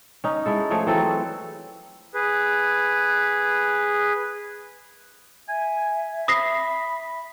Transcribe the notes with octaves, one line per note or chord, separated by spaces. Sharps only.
C#4 D#4
G#3 E4 A4
F3 A3 G#4 C#5
E3 F#3 C4 A4
G#4 B4
E5 G#5
B5 D#6 A#6 C7